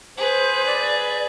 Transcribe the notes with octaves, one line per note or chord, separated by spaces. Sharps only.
G#4 B4 C5
D5